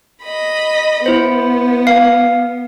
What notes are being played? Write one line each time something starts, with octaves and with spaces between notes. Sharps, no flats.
D#5 B5
B3 E4 C5
F5